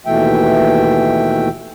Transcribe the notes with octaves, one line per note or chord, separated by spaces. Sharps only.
D#2 B2 E3 A3 E5 G5